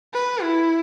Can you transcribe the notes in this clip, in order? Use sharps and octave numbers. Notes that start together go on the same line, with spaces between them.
B4
E4